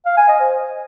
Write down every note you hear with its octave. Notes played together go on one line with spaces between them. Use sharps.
F5
G#5
D#5
C5